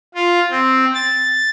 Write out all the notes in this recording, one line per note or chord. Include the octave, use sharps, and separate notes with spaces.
F4
C4
A6